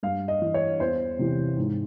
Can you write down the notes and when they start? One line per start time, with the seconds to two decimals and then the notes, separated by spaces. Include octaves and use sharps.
0.03 G2 F5
0.28 D#5
0.42 E3
0.54 C#5
0.80 E2 C5
1.19 C3 E3
1.58 G#2